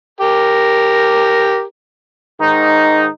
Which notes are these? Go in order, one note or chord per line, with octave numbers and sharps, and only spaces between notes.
G4 A#4
G#2 D#3 D#4